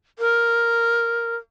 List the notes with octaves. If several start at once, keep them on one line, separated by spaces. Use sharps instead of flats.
A#4